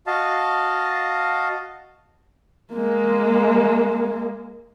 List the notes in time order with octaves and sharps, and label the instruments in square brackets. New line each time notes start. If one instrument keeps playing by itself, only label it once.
[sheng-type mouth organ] F#4 D#5 F5 A5
[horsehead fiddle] G#3 A#3